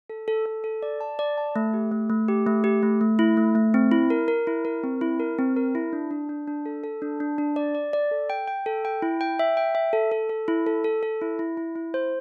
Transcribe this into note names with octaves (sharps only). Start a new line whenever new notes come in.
A4
A4
A4
A4
D5
A5
D5
A5
A3
G4
A3
A3
G4
A3
G4
A3
A3
E4
A3
A3
C4
E4
A#4
A#4
E4
A#4
C4
E4
A#4
C4
A#4
E4
D4
D4
D4
D4
A4
A4
D4
D4
D4
D5
D5
D5
A4
G5
G5
A4
G5
E4
G5
E5
G5
E5
A4
A4
A4
E4
A4
A4
A4
E4
E4
E4
E4
C5